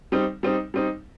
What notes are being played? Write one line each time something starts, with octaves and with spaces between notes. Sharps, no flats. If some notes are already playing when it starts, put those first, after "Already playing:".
G3 C4 D#4
G3 C4 D#4
G3 C4 D#4